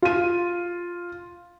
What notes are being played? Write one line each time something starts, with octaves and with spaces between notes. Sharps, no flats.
F4 D#7